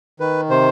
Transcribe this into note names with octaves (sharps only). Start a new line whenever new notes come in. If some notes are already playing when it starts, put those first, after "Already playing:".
D#3 B4
C3 C5